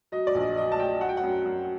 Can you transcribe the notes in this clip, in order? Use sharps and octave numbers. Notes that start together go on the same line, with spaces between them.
F#3 D#5
D5
A#1
D#5
F#3 D#5
A5
F#3 G5
F#3 F#5
G5
F#5
F#2
F#2